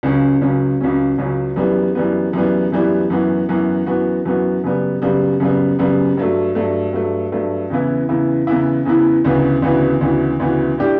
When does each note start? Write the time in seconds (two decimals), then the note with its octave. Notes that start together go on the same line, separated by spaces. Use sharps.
0.03 C#2 C#3 F#3 C#4
0.41 C#2 C#3 F#3 C#4
0.81 C#2 C#3 F#3 C#4
1.18 C#2 C#3 F#3 C#4
1.56 F#2 E3 G3 B3
1.95 F#2 E3 G3 B3
2.33 F#2 E3 G3 B3
2.72 F#2 E3 G3 B3
3.10 F#2 E3 B3 F#4
3.49 F#2 E3 B3 F#4
3.86 F#2 E3 B3 F#4
4.25 F#2 E3 B3 F#4
4.64 F#2 C#3 G3 B3
5.02 F#2 C#3 G3 B3
5.40 F#2 C#3 G3 B3
5.79 F#2 C#3 G3 B3
6.17 G2 F#3 A3
6.55 G2 F#3 A3
6.93 G2 F#3 A3
7.32 G2 F#3 A3
7.70 E2 C#3 E3 B3 E4
8.09 E2 C#3 E3 B3 E4
8.47 E2 C#3 E3 B3 E4
8.85 E2 C#3 E3 B3 E4
9.24 D2 C#3 E3 B3 F#4
9.62 D2 C#3 E3 B3 F#4
10.01 D2 C#3 E3 B3 F#4
10.39 D2 C#3 E3 B3 F#4
10.78 A2 G3 D4 G4